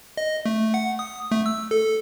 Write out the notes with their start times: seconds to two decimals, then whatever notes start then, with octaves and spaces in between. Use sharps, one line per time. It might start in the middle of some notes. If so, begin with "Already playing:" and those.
0.17 D#5
0.46 A3
0.74 F#5
0.99 D#6
1.32 A3
1.46 E6
1.71 A4